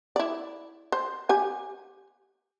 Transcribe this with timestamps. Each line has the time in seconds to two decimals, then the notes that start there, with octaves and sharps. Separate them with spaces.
0.16 E4 D5
0.92 C5
1.29 G4 G#5